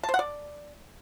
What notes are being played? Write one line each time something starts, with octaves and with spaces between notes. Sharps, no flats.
A5
C5
F#5
D5